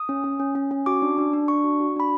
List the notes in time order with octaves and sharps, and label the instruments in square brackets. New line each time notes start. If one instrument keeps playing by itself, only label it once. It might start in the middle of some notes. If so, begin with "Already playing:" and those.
Already playing: [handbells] D#6
C#4
C#4
C#4
C#4
C#4
F#4 D6
D4
D4
D4
D4 C#6
F#4
F#4
D4 B5